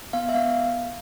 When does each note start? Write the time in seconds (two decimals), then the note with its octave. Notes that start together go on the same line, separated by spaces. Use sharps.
0.13 B3 F5
0.29 E5
0.34 B3 F5